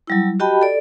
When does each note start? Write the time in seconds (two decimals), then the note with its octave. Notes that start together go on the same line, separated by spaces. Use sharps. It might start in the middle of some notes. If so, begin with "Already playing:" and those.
0.07 F#3 G3 E4
0.40 F#4 G4 D#5 G5 A5 B5
0.62 A4 D5